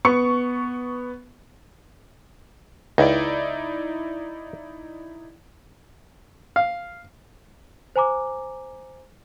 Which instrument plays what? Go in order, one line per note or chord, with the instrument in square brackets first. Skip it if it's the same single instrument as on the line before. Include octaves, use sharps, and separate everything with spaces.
[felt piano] B3 C#6 C#7
[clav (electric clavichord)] C#2 [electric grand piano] D#4 E4 D5
[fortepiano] F5
[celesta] C5 G#5 A#5 D6